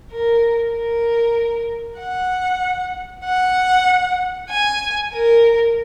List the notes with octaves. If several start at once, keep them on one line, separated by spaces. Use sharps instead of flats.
A#4
A#4
F#5
F#5
G#5
A#4